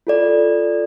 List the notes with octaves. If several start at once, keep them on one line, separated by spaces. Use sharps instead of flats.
F4 A4 D5